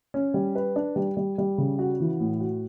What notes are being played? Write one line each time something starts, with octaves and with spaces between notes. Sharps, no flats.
C#4
G3
B4
D4
G3
G3
G3
C#3
F#4
E3
A2
F#4